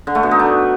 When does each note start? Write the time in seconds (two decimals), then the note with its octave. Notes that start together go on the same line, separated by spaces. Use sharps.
0.07 D3
0.15 A3
0.23 B2
0.31 D#4
0.39 D4